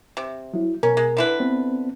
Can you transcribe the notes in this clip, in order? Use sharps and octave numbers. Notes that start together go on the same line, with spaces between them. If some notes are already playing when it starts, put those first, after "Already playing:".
C3
F#3 E4
B2 C#4 A#4
G#3
D3 E4 B4
B3 C4